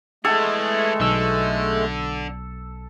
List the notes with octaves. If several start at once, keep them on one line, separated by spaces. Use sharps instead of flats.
E3 G#3 A3 G#4 A4
B1 D3 E6